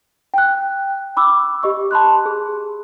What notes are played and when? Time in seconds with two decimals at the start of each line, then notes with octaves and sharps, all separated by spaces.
0.34 G5 F#6
1.17 B5 D6 E6
1.63 G4 D#5 C#6
1.91 A5 B5 C6 F#6
2.26 G#4